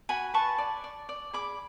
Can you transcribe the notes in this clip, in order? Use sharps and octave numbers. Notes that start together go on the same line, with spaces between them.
F#4 G#5 B5
B4 A5 C#6
D5
D5
D5
G#4 B5 D6